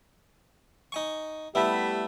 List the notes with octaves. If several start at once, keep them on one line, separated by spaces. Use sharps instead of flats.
D#4 G#5 C#6
G3 A3 B3 E4 G4 E5